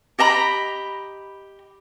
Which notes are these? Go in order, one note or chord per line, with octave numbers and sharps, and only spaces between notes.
G4 D#5 A#5 B5